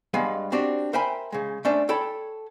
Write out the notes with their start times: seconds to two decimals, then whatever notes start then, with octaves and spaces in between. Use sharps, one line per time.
0.14 G2 G#3 B3 F5 G#5
0.52 C4 D4 F#4 G4
0.93 A#4 C5 E5 G5 G#5 B5
1.32 C#3 G#3
1.65 A3 C#4 D4 C5
1.89 A4 C#5 G5 A5 B5